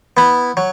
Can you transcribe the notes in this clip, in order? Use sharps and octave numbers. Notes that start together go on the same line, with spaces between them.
B3 E4
F#3